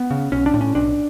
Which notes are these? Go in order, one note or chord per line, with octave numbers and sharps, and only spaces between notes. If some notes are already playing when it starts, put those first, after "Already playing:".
Already playing: B3
C#3
B1 C#4
D4
A2
C#4
B1 D4